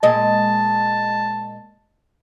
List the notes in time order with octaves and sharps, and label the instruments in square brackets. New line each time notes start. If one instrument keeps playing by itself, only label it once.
[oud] A#2 G#3 D#5 [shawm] A5